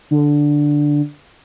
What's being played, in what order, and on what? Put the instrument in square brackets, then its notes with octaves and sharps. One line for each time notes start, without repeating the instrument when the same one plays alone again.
[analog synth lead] D3